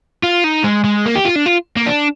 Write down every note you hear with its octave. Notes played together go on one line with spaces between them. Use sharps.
F4
D#4
G#3
G#3
A#3
G4
F4
D4
F4
A#3
D4